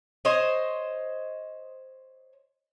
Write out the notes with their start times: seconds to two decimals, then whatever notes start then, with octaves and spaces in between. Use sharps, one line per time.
0.25 C5 C#5 D#5